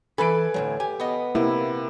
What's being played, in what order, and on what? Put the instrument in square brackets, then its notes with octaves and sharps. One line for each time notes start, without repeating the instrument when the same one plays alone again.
[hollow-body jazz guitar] E3 B5 [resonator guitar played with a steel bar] A4 B4 [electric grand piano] G#5 D7
[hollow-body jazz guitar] D2 A2 F#3
[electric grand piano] G4 [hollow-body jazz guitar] G#5
[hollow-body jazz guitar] B3 D#5
[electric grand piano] C3 [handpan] A#3 E4